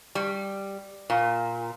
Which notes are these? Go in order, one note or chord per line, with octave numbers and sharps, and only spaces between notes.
G3
A#2